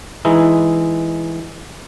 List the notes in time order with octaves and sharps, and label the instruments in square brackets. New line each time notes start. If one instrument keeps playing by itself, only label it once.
[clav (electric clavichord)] E3 G#3 D#4 E4